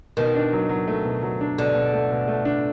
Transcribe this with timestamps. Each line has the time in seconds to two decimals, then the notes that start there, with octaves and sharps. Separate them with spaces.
0.17 B2 D#3
0.35 D4
0.53 F#3
0.69 F#3
0.88 A3
1.05 B2
1.23 F#3
1.41 D4
1.58 B2 D3
1.75 B2
1.93 A3
2.11 B2
2.28 A3
2.45 D4